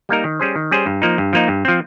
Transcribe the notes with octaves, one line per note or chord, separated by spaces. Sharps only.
G3 A#3 D#4 A#4
D#3
G3 C#4 G#4 C5
D#3
G3 C#4 G#4 C5
G2
F3 A#3 D#4
G2
F3 A#3 D#4
G2
F3 C4